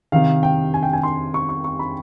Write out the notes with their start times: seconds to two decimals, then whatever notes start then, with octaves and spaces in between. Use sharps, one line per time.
0.12 C3 D#3 F5
0.43 G5
0.74 G#5
0.83 G5
0.93 G#5
1.03 C6
1.34 C#6
1.49 C#6
1.64 C#6
1.79 B5